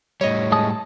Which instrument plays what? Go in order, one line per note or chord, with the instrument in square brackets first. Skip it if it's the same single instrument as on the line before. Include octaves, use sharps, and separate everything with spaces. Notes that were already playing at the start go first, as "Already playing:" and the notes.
[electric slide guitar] A2 G3 [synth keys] C#5 D#5
[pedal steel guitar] G#3 A5 D#6
A5